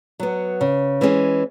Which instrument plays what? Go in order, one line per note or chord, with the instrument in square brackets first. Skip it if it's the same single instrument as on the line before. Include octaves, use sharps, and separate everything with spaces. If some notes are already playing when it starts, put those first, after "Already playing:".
[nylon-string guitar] F#3 B3
C#3
E3 G#3 C#4 G#4